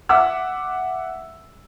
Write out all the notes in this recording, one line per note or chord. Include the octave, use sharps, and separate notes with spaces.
E5 F#5 D6 E6